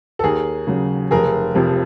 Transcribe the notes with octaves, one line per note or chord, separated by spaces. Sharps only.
A4
D#2 G#4 A#4
C#3 F#3
F1 G#4 A#4
F2 C3 F3